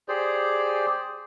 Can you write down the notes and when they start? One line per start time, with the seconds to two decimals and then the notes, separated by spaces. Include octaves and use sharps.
0.08 G4 G#4 C5 D5